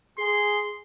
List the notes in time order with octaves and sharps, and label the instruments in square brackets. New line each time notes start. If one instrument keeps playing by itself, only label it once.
[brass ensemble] G#4 [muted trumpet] C6